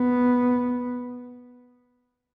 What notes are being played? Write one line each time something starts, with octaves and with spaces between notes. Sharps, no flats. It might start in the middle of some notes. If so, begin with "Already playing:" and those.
Already playing: B3